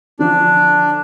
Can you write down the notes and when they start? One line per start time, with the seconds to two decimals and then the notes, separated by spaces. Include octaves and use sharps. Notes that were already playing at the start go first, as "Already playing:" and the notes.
0.19 D3 F3 D4